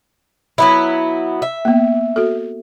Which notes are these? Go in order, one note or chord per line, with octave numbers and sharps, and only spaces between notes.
F#3 B3 E4
E5
A#3 B3
F#4 A4